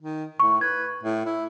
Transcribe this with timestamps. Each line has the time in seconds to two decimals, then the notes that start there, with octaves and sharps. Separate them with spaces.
0.01 D#3
0.40 A2 C#6
0.61 B4 G#6
1.04 A2
1.26 E4